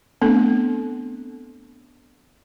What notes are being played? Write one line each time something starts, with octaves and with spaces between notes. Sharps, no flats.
A3 B3 C4 D4 A4